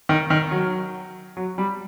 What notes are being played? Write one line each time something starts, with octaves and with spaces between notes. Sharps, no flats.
D#3
D#3
F#3
F#3
G3